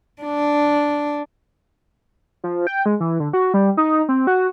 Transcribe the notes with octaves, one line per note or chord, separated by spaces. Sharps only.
D4
F3
G5
G#3
E3
D3
F#4
G3
D#4
C4
F#4